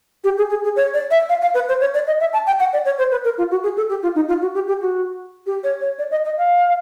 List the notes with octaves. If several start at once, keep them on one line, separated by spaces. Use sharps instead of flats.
G4
G#4
G#4
G#4
C#5
D5
E5
F5
F5
B4
C5
C#5
D5
D#5
E5
A5
G5
F#5
D5
C#5
C5
B4
A#4
F4
F#4
G#4
A4
G4
F4
D#4
F4
F#4
G4
G4
F#4
G4
C#5
C#5
D5
D#5
D#5
F5